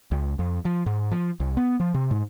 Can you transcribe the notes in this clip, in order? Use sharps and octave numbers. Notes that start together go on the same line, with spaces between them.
C#2
F2
F3
G#2
F3
C2
B3
F3
C3
G#2